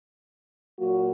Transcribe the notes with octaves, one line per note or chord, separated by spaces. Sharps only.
A#2 F#3 A#3 F#4